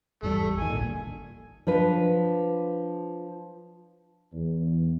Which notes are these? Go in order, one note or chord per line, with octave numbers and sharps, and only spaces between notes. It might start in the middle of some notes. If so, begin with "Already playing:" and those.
G#1 E2 G3 A3
G#1 D#3 G#5
D1 A#1 A#2
F3 D4 B4
E2